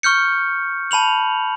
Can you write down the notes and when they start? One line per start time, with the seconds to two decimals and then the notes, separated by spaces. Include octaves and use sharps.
0.03 C#6 F6 G6 C#7
0.91 A5 B5 F7 F#7